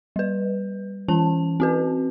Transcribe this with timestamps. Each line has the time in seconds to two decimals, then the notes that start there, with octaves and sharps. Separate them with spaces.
0.16 G3 B4
1.08 E3 C#4 A5
1.60 C4 F#4 B4